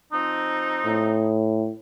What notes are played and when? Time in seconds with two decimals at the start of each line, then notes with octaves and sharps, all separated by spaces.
0.13 F3 C4 D#4
0.85 A2